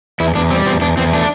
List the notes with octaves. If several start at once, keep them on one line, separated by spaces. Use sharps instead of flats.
E2 E4
E2 D4
G3 C4
E2 C4
E2 D4
E2 C4
A3 D4